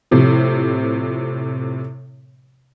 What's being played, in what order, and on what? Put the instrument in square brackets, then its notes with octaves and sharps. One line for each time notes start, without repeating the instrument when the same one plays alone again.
[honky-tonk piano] A2 C3 F3